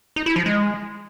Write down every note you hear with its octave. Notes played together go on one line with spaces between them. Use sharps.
D#4
E4
F3
G#3